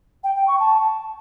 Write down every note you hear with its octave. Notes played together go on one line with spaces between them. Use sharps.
G5
G5
C#6
A5